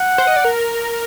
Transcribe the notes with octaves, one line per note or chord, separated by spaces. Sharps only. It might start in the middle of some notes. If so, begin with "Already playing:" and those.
Already playing: F#5
C5
D#5
D5
A#4